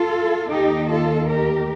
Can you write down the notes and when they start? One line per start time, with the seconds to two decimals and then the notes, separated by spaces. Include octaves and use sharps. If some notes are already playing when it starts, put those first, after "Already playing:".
Already playing: F4 A4
0.50 D#2 D#3 D#4 G4
0.90 F4 A4
1.29 G4 A#4